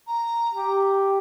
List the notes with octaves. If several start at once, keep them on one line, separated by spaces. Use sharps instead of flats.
A#5
G4